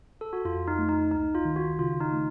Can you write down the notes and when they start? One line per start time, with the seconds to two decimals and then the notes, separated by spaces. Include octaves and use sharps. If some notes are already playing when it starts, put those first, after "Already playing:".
0.21 A4
0.33 F#4
0.45 F2 F4
0.68 D#4
0.79 A3
0.89 D#4
1.11 C#2 D#4
1.35 F4
1.45 D#3
1.56 F#4
1.79 C#3 F4
2.00 D#4
2.12 A3